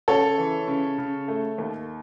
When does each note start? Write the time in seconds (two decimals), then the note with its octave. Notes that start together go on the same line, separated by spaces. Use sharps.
0.08 C#3 A4 C#5
0.38 E3
0.68 C#3
0.98 C#3
1.28 A3
1.58 D#2